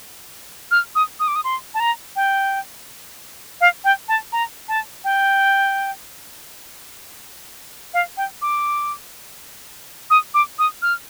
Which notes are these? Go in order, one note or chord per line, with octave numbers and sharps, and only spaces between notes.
F6
D#6
D#6
D6
D#6
C6
A5
A#5
G5
F5
G5
A5
A#5
A5
G5
F5
G5
D6
D#6
D6
D#6
F6